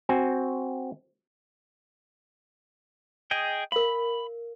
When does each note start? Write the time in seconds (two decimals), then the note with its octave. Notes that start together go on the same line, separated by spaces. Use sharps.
0.09 C4 F#4 G#5
3.31 G#4 D#5 G5
3.72 A#4 F5 B5